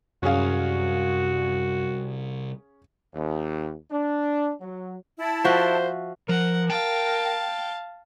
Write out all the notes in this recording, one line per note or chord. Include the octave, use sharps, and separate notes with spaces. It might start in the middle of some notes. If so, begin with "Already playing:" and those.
C2 F#2 C#4 F#4 G#4 F5
D#2
D4
F#3
E4 A5
F3 F#4 C5 E5
F3 A#4 F#5
F5 G5 A5